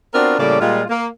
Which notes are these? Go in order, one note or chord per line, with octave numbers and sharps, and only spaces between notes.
B3 C4 D4 F4 F#4 A#4
A2 C#3 G3 A#3 A4 D5
A#2 G3 G#3 F4
A#3